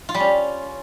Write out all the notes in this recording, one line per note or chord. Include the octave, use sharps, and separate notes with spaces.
F4
G3
C#4